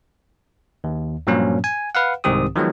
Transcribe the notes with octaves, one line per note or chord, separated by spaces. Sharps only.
D#2
G2 A#2 F3 F#3 A#3 C#4
G#5
B4 F5 F#5
C2 G#2 D#3 C4 G4 D#6
D#3 F3 F#3 G#3 B3